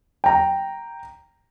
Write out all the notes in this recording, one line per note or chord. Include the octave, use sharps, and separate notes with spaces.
G5 A#5